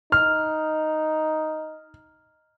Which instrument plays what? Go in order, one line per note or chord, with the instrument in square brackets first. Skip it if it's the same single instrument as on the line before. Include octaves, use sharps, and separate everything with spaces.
[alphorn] D#4 [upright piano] F6